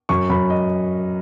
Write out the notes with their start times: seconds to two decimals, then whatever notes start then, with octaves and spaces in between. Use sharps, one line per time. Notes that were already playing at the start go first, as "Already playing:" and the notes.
0.09 F#2 C#6
0.30 F#2 B5
0.50 D#5